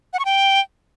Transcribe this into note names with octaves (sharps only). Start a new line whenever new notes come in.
F#5
C#6
G5